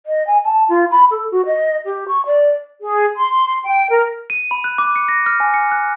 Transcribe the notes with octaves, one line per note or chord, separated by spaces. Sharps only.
D#5
G#5
A5
F4
B5
A4
F#4
D#5
G4
C#6
D5
G#4
C6
G5
A#4
D#7
B5
F#6
D6
C#7
A#6
F6
G#5
C#7
F#6